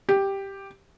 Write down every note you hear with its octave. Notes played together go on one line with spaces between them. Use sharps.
G4